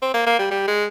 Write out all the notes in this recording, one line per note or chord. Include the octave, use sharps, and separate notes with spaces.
C4
A#3
A#3
G3
G3
G#3